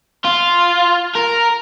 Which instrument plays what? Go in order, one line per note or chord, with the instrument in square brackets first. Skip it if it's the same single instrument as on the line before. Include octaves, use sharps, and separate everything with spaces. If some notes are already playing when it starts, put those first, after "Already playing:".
[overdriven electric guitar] F4
A#4